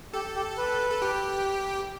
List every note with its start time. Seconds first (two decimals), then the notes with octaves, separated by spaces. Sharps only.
0.13 G4 A4
0.35 G4
0.58 B4
0.90 A4
1.02 G4